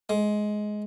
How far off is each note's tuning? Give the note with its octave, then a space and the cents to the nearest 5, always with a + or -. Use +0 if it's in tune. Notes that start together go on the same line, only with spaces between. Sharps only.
G#3 +15